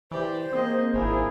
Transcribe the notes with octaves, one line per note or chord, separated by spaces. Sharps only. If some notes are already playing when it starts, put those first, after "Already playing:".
E3 G4 C5 D5
A#3 C4 G#4 D#5
G#1 A#3 D4 E4 G#4 A#4